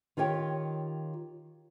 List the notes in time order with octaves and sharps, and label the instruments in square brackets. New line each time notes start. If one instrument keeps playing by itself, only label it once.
[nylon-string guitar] D#3 F4 G4 C#5 G5